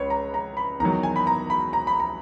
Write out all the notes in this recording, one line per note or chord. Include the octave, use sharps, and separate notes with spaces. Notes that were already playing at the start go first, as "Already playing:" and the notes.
Already playing: C#2 B4 C#5
A#5
A#5
B5
E2 D#3 F#3 A#5
G#5
B5
A#5
B5
A#5
B5
A#5